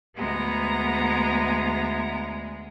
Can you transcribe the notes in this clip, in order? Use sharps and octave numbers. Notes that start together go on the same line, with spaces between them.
D2 G#3 B3 A#5